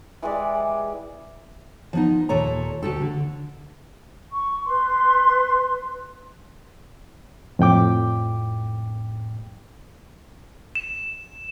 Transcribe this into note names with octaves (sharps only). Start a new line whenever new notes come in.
E3 G#3 G4 D5
F3 B3 D#4
D#2 A#2 A4 C#5 A#5
D2 F#4 G4 A4
D3
C#6
B4 C6
F2 A2 G5 D6
E7